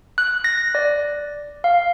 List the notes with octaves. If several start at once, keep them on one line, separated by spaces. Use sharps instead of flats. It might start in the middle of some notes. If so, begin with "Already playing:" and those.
F#6
A#6
D5
F5